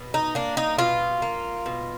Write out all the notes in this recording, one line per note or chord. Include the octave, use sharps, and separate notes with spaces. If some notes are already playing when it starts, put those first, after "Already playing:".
Already playing: B2
D#4
A#3 D4
D#4
B2 F4
A#3
B2